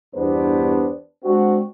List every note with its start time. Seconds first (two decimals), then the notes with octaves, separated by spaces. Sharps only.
0.15 E2 G2 B3 D4 G4 C5
1.24 G#3 C4 D4 F#4